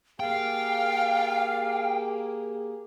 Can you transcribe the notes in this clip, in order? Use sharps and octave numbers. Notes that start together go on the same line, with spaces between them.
A#3 G4 G#4 F5 G5